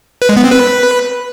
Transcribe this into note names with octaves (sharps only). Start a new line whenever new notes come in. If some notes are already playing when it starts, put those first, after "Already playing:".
B4
G#3
B3
C4
B4